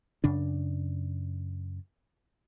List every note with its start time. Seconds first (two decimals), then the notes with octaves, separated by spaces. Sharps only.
0.24 F#2 C#3 D4